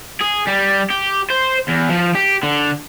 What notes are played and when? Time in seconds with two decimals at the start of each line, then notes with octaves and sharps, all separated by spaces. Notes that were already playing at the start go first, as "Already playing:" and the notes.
0.21 G#4
0.48 G3
0.91 G4
1.30 C5
1.68 E2
1.89 F3
2.15 G4
2.43 D3